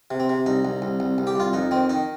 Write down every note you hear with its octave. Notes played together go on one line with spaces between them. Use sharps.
C3
C4
C3
C2 D#4
C2
C2
C2
C2
G4
C2 F4
F2 D#4
D#3 C4
D#3 D#4